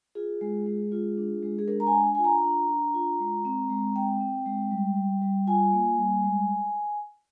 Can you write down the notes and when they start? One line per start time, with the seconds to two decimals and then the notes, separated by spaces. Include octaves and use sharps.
0.15 F4 G#4
0.41 G#3
0.66 G#3
0.92 F4
1.18 D4
1.43 G#3
1.59 G#4
1.68 D4 A#4
1.80 A#5
1.87 G#5
1.93 D4
2.15 F4 G#5
2.24 A#5
2.44 D4
2.69 D4
2.94 F4
3.20 G#3
3.45 C4
3.70 G#3
3.95 C4 G5
4.21 C4
4.46 G#3
4.71 G3
4.96 G3
5.22 G3
5.47 F4 G#5
5.72 A#3
5.98 G3
6.24 G#3